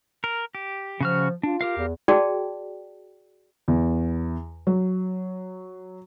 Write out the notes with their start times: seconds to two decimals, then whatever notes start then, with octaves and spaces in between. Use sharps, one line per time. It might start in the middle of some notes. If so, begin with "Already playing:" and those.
0.24 A#4
0.55 G4
1.01 C#3 F3 F#4 F6
1.43 D4 F4
1.61 G4 A#4 F5
1.77 E2
2.08 F#4 G#4 D5 G5 A5
3.68 E2
4.67 F#3